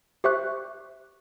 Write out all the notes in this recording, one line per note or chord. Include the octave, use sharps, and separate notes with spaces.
G4 C5 E5 C#6 F#6